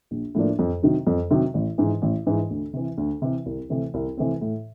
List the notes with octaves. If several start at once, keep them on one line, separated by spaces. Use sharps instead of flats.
A#1
A2 F3 A#3 D4
F2
C3 D#3 F#3
F2
C3 D#3 F#3
A1
G#2 E3
A1
G#2 E3
D2
C3 E3
D2
C3 E3
C2
C3 E3 A3 C4
C2
C3 E3 A3 C4
A2